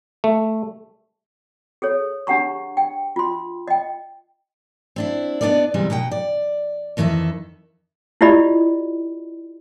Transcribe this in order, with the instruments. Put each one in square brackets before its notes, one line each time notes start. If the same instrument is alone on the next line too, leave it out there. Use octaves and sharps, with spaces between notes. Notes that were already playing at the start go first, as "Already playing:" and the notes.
[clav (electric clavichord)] A3
[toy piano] G#4 A4 C#5
D4 G4 F#5 A#5 C#6
G5
F4 C6
D#5 G5
[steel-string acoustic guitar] C4 D4 E4
B3 D4 D#4 A#4 D5
C3 E3 G3 G#3 B3
B2 D#4 F#5 G5
D5
F2 D#3 E3 E4 A4
[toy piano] E4 F4 G4 D5 D#5 B5